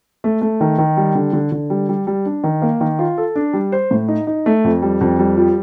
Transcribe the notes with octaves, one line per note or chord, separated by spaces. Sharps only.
A3
A3
D#3
D#3
G3
D3
D3
D3
G3
G3
G3
D4
D#3
A#3
D#3
F4
A4
D4
G3
C5
A2
D#4
D#4
A3
F2
G3
F2
G3
F3